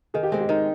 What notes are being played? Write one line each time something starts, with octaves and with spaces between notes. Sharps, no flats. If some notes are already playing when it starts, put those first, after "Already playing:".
D#3 G#4
G4
G#3 C4 G#4
G4
D#3 D#4